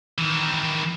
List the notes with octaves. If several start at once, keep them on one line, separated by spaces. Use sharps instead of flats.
D#3 E3